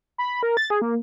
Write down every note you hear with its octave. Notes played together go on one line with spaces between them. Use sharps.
B5
A#4
A6
G#4
A#3